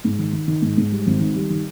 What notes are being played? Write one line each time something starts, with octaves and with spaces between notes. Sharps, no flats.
G#2
D#3
D#3
D#3
G#2
G#2
G3
G#1
D#3
G3
D#3